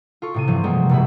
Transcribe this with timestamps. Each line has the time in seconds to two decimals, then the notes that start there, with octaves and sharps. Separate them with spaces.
0.22 F4 A4 C#6
0.34 A2 C3 D#7
0.47 G2 C3 E3 F3 C4
0.64 G3 G#3 A#3 B3
0.89 F1 A#1 B2 A3 E5 B5